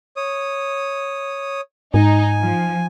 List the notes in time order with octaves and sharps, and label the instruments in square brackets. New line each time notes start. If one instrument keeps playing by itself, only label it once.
[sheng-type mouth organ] C#5 D#6
[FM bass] G#2 [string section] D#4 [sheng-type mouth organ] G#5
[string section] F3